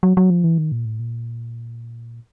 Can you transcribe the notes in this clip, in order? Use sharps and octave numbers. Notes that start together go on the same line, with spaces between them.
F#3
F#3
F3
E3
D#3
A#2
A2
A#2